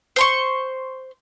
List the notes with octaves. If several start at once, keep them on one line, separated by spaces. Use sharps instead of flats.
C5 C6 C#6